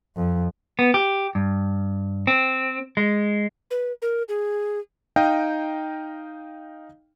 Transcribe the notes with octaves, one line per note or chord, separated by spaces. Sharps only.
F2
B3
G4
G2
C4
G#3
B4
A#4
G#4
D#4 D#5 F5 G5